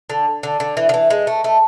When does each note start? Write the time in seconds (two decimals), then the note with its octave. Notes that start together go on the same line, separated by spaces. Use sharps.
0.10 D3
0.43 D3
0.60 D3
0.77 E3
0.89 D3
0.94 E3
1.10 G#3
1.27 A3
1.44 A3